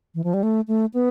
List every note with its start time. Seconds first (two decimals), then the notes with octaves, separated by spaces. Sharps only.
0.15 E3
0.24 F3
0.34 G3
0.43 A3
0.68 A3
0.94 B3